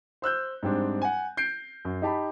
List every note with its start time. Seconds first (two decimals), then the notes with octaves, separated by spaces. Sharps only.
0.22 C5 E6 F#6 G6
0.63 G#2 G3 C4 D4
1.02 F#5 G#5
1.37 G6 C7 D7
1.85 F#2
2.02 D#4 G4 A5 B5